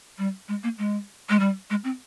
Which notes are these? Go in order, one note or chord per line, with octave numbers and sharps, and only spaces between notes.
G3
G#3
A#3
G#3
G#3
G3
G#3
C4